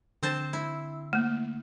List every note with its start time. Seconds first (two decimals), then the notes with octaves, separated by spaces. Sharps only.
0.23 D3 C4 C5 A5
0.53 E4
1.13 A3 A#3